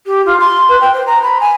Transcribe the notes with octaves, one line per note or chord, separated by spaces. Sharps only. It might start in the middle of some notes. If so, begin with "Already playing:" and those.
G4
F4
C6
B4
G5
C5
A#5
B5
G#5